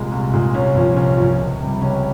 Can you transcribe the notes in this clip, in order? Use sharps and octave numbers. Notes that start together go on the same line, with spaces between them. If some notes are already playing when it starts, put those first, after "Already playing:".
Already playing: C2 A#2 G#3
C2
A#2 G#3
C2 C#4
A#2 F3
C2 C#4
A#2 F3
C#2
C3 G3
C#2 C#4